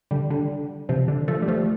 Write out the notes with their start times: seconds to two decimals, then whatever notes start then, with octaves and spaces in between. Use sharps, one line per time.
0.11 D3 G3
0.30 D3 G3
0.89 C3 F3
1.08 D3
1.28 F3 A3
1.42 G3
1.48 F3 A3